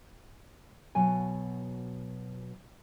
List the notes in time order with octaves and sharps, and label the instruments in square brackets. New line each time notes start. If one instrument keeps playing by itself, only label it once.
[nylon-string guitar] B2 F#3 G#5